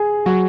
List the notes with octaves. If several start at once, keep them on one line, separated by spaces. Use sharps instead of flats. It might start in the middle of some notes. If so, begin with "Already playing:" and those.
Already playing: G#4
F#3 F#4